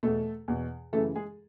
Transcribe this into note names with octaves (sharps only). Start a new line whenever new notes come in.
E2 B2 A3 A4
E2 B2
F#2 C#3 E3 A3 A4
G#3 G#4